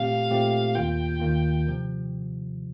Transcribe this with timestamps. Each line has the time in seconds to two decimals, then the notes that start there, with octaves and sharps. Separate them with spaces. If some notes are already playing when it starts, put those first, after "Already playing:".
Already playing: A#2 A3 C4 G4 F5
0.31 A#2 A3 C4 G4
0.75 D#2 D#3 A#3 F4 G5
1.20 D#2 D#3 A#3 F4
1.67 C3 F3